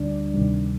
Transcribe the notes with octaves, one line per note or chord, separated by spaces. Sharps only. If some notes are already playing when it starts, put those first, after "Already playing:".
Already playing: D2 D3 G3 D4 D5
D2 C3 D#3 G3